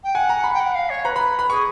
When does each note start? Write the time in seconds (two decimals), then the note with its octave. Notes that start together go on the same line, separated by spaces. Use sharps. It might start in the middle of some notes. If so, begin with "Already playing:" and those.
0.03 G5
0.14 F#5 G#5
0.29 A#5
0.44 B5
0.53 G5
0.59 F#5
0.74 F5
0.89 C#5
1.05 B4 A#5
1.16 B5
1.39 B5
1.50 G#4 C#6